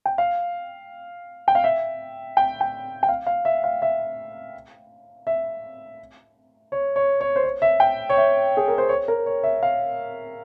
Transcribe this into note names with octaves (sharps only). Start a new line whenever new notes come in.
G5
F5
G5
F5
E5
G5
G5
G5
F5
F5
E5
F5
E5
E5
C#5
C#5
C#5
C5
C#5
E5
G5
C#5
E5
G#4
A#4
C5
C#5
A#4
C#5
E5
F5